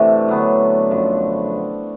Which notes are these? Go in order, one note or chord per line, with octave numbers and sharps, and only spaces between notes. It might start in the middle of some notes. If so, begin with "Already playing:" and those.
Already playing: C3 E3 A3 D4
D3 F#3 B3
F#2 D3 F3